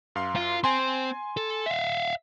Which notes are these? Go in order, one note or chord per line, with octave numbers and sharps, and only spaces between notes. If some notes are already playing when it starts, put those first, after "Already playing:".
F#2 F5 C6
F4
C4 G#5 C6
A4
E5 F5